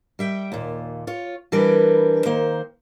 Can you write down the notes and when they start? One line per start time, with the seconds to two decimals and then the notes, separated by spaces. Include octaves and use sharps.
0.19 G3 E5 G5
0.52 D#2 A#2
1.07 F4 C#5
1.52 E3 G3 D4 A#4 B4
2.25 D#3 A#3 C5